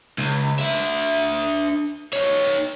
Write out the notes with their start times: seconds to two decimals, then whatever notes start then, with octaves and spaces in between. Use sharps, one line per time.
0.18 C#2
0.59 D4 E5
2.13 D#4 C#5